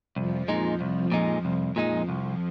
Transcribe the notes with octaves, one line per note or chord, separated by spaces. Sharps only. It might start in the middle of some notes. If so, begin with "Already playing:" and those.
C2 F2 F3
A#2 G#3 D#4
C2
A#2 G#3 D#4
C2 F2 F3
F2 A#2 F3 G#3 D#4
C2 F2 F3